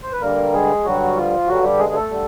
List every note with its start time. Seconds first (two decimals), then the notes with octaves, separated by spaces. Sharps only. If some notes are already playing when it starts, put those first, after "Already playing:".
0.03 C5
0.12 B4
0.21 G2 D3 G3 A#3 A#4
0.53 G#3 G#4
0.84 G2 D3 F#3 G3 F#4
1.16 F3 F4
1.48 G2 D3 F#3 G3 F#4
1.64 G3 G4
1.79 G#3 G#4
1.89 G#4
1.95 A3 A4
2.11 D3 G3